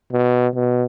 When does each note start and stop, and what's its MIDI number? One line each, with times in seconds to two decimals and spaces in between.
0.13 0.48 47
0.55 0.84 47